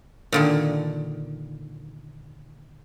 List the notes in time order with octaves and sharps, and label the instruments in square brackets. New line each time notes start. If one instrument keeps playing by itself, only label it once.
[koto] A#2 D3 D#3